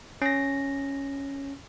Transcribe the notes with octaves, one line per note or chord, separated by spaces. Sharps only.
C#4 A#6